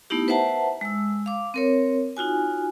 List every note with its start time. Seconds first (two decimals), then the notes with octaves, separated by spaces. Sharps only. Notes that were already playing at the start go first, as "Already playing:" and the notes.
0.10 A3 B3 D#4 E4 G4
0.28 B4 C5 E5 F#5 A5 A#5
0.81 G#3 E6
1.26 F5 D6
1.54 C4 A#4 C#5
2.17 D#4 F4 F#4 G#5